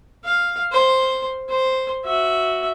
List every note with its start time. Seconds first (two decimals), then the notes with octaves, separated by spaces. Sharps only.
0.24 F5
0.72 C5
1.49 C5
2.05 F#4 E5